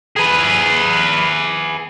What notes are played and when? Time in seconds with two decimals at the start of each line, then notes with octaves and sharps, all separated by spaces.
0.17 G#4 B4